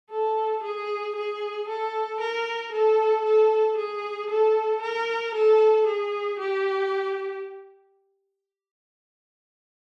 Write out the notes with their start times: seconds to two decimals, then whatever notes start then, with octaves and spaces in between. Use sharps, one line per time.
0.10 A4
0.63 G#4
1.16 G#4
1.68 A4
2.21 A#4
2.72 A4
3.25 A4
3.77 G#4
4.30 A4
4.82 A#4
5.35 A4
5.87 G#4
6.40 G4